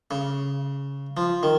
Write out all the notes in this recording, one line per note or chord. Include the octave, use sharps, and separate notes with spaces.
C#3
F3
D#3